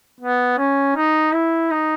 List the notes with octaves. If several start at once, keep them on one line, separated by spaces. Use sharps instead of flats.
B3
C#4
D#4
E4
D#4